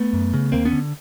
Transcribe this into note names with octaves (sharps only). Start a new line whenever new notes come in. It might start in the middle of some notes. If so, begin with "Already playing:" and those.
Already playing: A3 B3
F#2
C#3
D#2 A#3 C4
B3 C#4
D3